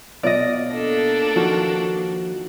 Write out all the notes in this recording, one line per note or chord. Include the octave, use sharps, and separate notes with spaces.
B2 F4 D5 D#5
A#3 D4 A4
D#3 F3 F#4